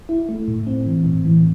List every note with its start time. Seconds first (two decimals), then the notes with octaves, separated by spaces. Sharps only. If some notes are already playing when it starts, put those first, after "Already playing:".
0.09 E4
0.29 A3
0.48 A2
0.67 C4
0.87 E3
1.06 A2
1.25 E3